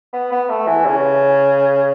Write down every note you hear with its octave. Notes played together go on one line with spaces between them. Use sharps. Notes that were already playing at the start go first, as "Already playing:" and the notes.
B3
B3
A3
E3
C#3